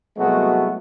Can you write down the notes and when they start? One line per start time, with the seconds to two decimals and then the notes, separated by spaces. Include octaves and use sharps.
0.17 C2 F#3 G#3 A3 B3 F#4